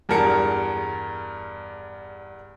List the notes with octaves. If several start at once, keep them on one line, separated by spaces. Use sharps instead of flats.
E2 G2 G#4 A#4 A5 C#7